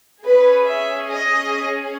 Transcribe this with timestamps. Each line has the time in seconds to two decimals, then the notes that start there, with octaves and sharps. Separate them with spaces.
0.25 C#4 G#4 B4
0.67 E5
1.08 D#5